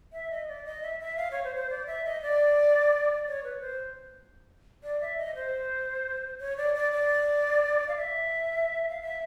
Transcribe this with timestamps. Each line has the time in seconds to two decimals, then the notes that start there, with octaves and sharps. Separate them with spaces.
0.13 E5
0.31 D#5
0.48 D5
0.65 D#5
0.83 E5
1.00 E5
1.17 F5
1.31 C#5
1.44 C5
1.56 C5
1.70 D5
1.87 E5
2.05 D#5
2.22 D5
3.27 C#5
3.44 B4
3.61 C5
4.83 D5
5.01 E5
5.18 D#5
5.35 C5
6.41 C#5
6.57 D5
6.75 D5
6.92 D5
7.89 F5
7.97 E5
8.90 F5
9.02 E5